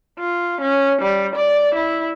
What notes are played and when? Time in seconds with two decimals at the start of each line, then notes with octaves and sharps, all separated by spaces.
0.19 F4
0.61 C#4
1.02 G3
1.35 D5
1.75 E4